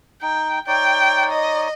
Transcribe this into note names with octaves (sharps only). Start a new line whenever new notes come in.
D#4 G5
D#4 C#5 D5 G5
D#5